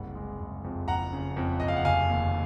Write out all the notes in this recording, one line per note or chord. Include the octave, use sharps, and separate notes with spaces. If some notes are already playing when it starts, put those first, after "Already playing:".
Already playing: F#1 C2 F#5
G#3
F#1
F2
F#1 F#5 A#5
C#3
F2
F#1 D#5
F5
F#5
F1 F5 G#5
D#2